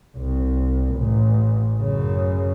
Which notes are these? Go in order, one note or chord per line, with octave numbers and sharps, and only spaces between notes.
C2
A1
F#2 C#3